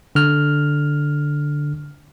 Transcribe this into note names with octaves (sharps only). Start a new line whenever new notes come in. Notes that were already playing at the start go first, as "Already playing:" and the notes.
D3 F6